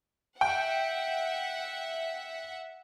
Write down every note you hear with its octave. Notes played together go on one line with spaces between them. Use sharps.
E5 F#5 G5